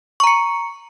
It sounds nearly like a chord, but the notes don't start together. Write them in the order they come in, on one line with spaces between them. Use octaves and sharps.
C#6 A#5 C#7